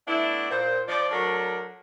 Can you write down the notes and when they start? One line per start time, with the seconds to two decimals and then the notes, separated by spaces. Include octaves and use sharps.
0.08 A3 B3 D4 E4
0.51 A#2 C5
0.88 F3 D5
1.11 F#3 A3 D4 F#4 A#4 C#5